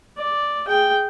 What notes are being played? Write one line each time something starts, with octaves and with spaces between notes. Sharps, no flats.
D5
G#4 G5